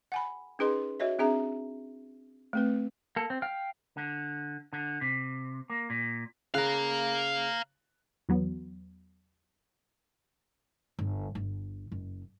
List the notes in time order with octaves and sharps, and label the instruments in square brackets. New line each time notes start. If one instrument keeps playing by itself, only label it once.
[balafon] F#5 G#5 B5
C#4 D#4 G#4 B4 D#5 C6
F#4 C#5 D#5 E5
C4 D4 G#4 E5 A#5
A3 C4 B4
[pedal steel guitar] A#3 A4
C4
F5 G5 F6
[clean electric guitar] D3
D3
C3
A#3
A#2
[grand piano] C#3 F#6 [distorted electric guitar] F5 A#5
[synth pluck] E2 F#3 B3
[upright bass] G1
G1
F#1